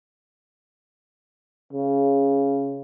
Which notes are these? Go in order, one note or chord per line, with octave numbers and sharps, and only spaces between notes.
C#3